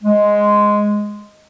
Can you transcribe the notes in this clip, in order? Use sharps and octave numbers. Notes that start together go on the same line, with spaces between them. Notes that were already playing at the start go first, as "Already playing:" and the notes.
G#3